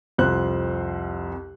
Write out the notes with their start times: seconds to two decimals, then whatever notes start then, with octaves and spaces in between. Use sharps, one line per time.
0.18 C2 F2 C5 F#6